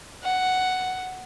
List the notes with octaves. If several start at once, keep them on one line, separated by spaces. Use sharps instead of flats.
F#5